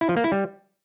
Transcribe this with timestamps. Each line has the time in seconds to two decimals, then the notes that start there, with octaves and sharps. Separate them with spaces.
0.01 E4
0.09 F3
0.17 A#3
0.24 E4
0.32 G3